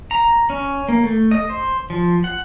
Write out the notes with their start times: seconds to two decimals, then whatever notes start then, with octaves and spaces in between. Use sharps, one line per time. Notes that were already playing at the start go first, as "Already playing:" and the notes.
0.11 A#5
0.50 C#4
0.89 A#3
1.04 A3
1.31 D#5
1.49 C5
1.90 F3
2.24 F#5